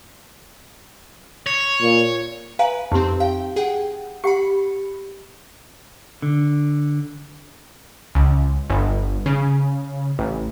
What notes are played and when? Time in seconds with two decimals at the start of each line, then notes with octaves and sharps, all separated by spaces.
1.46 C#5
1.82 A#2
2.59 B4 F5 G#5 A#5
2.92 F2 C4 D#4 G4 C6
3.20 F5 G5
3.56 G#4 F#5 G5
4.24 G4 F#5 B5 C#7
6.22 D3
8.15 C#2
8.69 G1
9.26 C#3
10.19 A1